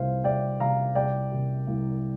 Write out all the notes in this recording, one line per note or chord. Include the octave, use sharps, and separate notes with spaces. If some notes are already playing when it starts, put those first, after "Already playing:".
Already playing: C2 C3 A#3 G4 C5 F5
C2 D5 G5
C3 A#3 G4 F5 A#5
C2 D5 G5
C3 A#3 G4
C2